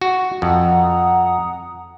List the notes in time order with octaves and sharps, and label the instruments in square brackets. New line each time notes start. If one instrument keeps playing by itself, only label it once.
[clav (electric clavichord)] F#4
[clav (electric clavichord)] F2 [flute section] F#5 A#5 D#6